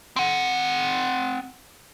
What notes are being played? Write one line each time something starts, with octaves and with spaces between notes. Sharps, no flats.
C4 F#5